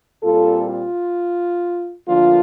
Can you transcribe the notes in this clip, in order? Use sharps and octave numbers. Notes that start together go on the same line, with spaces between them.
A#2 G3 C4 F4 A4
F4
D2 D3 F3 A#3 D4 F4